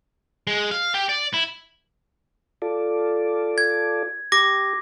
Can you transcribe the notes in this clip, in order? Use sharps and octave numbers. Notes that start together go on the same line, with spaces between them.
G#3
F5
G4
D5
E4
F4 A4 D5
G#6
G4 D6 A#6